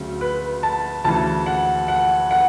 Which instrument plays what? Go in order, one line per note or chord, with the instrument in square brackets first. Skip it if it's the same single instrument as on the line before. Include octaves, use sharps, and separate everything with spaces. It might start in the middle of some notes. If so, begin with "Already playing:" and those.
Already playing: [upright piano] D2 C#3 F#3
B4
A5
D2 C#3 E3 A5
F#5
F#5
F#5